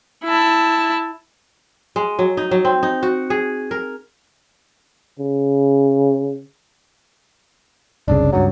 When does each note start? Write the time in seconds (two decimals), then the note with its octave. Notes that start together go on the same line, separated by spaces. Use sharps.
0.24 E4 A5
1.96 G#3
2.19 F#3
2.37 D#4
2.51 F#3
2.65 C4
2.83 D#4
3.03 F#4
3.30 G#4
3.71 A#4
5.19 C#3
8.08 F#1 C2 C#3 D4
8.32 C#2 G2 F#3